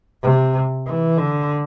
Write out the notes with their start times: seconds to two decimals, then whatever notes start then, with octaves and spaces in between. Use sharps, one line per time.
0.23 C3
0.87 E3
1.18 D3